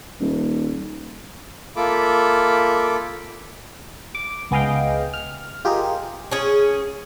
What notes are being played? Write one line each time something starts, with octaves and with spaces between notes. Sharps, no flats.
D#1
A#3 F4 A4 E5 B5 D6
D6
C#2 B3 G#4 D#5 F5 G5
F6
F4 G4 G#4 A#4 D#5
C#4 G#4